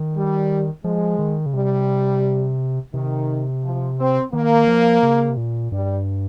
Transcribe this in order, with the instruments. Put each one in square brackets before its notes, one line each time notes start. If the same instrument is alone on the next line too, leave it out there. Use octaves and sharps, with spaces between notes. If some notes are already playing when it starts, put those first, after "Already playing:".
Already playing: [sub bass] D#3
[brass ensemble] G3
[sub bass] F3 [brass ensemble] G#3
[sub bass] D#3
C#3
[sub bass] C3 [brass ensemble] G3
[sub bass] C3 [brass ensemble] D#3
[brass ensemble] F3
C4
[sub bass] D#3 [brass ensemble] A#3
[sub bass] F3
C#3
C3
A#2
[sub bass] G2 [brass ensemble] G3